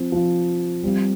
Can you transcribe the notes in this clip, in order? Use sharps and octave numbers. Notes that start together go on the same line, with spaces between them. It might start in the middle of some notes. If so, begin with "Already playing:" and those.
Already playing: F3 C4
F3 C4 F4
G3 C4 F4